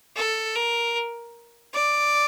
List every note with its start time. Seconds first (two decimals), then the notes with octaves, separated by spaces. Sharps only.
0.16 A4
0.55 A#4
1.74 D5